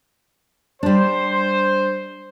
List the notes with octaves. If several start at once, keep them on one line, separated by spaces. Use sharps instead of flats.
G3 D4 C5